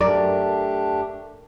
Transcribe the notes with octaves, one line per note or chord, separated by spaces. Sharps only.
F#2 A3 D4 G4 A#4 D5